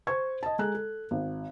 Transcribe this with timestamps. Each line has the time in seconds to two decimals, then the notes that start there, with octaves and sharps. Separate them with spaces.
0.07 C5 C#6 G#6
0.43 D#5 A5
0.59 G#3 A4 A#5 F#6
0.74 A4
1.11 G#1